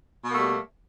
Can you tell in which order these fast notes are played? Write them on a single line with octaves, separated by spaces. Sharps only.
B2 A#3 A3 G3